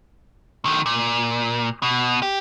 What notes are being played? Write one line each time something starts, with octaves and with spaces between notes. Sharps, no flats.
D3 D#3
A#2
B2
G4